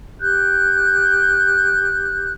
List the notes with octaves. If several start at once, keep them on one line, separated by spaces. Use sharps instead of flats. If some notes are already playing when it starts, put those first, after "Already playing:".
G4 F#6 G6